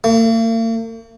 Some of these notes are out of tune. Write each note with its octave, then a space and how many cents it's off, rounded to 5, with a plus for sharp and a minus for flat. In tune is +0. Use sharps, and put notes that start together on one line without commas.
A#3 -45